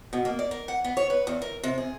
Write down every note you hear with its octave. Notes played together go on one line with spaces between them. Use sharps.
B2
A#3
D5
A#4
F#5
B3
C#5
B4
E2
A#4
C3
G#4